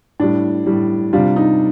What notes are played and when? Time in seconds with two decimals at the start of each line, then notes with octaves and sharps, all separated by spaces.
0.20 A2 G3 D4
0.66 A2 G3
1.13 C3 G3 D4 F4
1.36 D#4